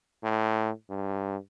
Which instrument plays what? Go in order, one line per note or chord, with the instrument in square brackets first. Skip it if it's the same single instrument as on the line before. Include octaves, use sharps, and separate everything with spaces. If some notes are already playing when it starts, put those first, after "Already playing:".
[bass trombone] A2
G2